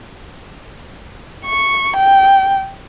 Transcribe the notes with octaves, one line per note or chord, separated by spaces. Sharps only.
C#6
G5